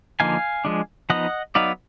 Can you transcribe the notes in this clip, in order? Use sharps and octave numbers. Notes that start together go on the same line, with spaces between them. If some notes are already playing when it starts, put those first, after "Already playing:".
D3 F3 A#3 D#4 F5 G#5
F3 G#3 D4
F3 B3 D#4 D#5 F#5
F#3 B3 D#4 D5 F5